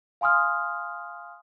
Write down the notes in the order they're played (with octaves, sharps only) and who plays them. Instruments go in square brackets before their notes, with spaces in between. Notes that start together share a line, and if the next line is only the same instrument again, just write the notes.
[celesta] F5 G#5 C6 D#6 F6